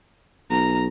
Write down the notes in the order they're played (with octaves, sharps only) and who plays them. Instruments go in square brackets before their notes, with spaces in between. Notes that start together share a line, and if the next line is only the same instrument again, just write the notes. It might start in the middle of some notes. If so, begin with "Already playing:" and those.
[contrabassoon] B1 [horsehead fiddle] A#5